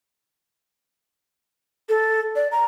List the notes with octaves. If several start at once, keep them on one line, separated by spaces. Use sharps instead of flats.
A4
D5
A#5